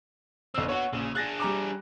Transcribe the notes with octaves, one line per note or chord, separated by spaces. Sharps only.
G1 C4 D#4 E6
B3 F#4 C#5 F#5
A#1 C#3
D4 G#4 F#6 A6 A#6
G3 A#5 D6